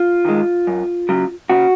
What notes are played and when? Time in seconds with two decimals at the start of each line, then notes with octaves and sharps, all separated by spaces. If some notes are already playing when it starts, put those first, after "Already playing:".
Already playing: F4
0.25 D#3 G#3
0.67 F#2
1.09 C#3 F#3
1.50 C#3 F#4